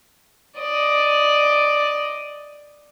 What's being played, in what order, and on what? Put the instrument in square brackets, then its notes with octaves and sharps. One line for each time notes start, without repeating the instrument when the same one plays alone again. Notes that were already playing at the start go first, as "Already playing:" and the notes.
[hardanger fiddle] D5 D#5